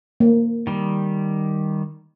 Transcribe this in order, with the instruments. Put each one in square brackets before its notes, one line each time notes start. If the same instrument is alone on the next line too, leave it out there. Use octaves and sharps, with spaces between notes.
[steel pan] A#3
[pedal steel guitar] D#3 G3